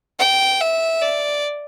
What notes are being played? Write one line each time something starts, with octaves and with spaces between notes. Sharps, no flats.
G5
E5
D5